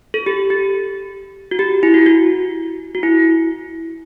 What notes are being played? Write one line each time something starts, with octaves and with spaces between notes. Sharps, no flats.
A4
G4
G4
F#4
G4
E4
F#4
F#4
F#4
E4